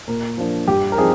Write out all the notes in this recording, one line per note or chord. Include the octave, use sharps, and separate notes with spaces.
A#2 A#4
F3 A#3 D4
G2 G4
A#4
F3 C4 D#4 G#4